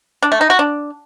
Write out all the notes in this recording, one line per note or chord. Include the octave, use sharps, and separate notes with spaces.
D4
A3
D#4
F#4
D4